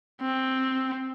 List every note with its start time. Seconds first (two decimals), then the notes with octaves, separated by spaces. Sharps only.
0.22 C4